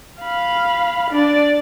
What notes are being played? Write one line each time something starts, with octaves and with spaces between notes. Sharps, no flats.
F5 B5
D4 D5